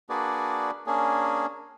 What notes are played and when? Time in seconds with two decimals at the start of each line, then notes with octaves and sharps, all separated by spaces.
0.10 A#3 D4 F#4 G#4 B4 D5
0.87 A#3 C#4 D4 G#4